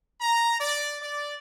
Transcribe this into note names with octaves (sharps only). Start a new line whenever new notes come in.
A#5
D5
D5